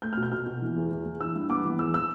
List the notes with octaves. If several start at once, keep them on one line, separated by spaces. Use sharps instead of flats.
A3 G6
F6
B2
G6
B2 F6
B2
E3
E2
E2
E2
E4 E6
G2
B3 D6
E3
E2 E6
E6